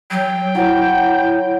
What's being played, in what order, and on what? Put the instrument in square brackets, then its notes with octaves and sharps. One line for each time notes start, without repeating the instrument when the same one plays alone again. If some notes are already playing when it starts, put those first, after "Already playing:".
[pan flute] F#3 [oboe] G5
[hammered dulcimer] F#3 [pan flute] E4